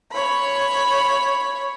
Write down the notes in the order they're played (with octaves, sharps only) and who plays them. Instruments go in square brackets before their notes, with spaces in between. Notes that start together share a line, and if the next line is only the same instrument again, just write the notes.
[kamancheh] C#5 B5